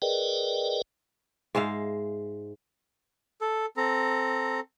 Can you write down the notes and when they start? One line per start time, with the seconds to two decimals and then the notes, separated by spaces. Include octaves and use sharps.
0.02 G#4 A#4 B4 D5 D#5 G5
1.55 G#2 G#3 E5 F5
3.41 A4
3.77 C4 A4 A#5